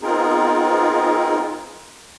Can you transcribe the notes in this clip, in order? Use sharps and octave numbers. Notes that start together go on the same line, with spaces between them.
B3 C4 D#4 F4 G#4 A#4